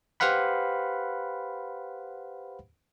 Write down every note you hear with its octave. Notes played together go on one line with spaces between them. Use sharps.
G4 B4 C5 F5 F#5 B5